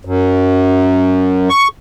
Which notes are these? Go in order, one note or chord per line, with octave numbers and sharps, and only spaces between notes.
F#2
C#6